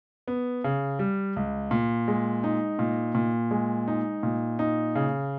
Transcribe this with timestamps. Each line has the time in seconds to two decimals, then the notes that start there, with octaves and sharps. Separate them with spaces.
0.28 B3
0.64 C#3
0.99 G3
1.36 C#2
1.71 A#2
2.08 G#3
2.44 D#4
2.79 A#2
3.15 A#2
3.51 G#3
3.88 D#4
4.23 A#2
4.59 D#4
4.95 C#3